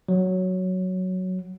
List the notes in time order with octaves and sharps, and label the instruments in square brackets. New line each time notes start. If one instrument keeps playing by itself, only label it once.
[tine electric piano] F#3